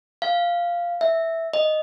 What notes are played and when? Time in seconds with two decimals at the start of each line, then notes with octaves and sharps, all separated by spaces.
0.22 F5
1.01 E5
1.53 D#5